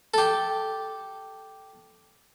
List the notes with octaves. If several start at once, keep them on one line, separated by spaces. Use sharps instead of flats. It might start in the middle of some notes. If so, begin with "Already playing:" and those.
G4 A4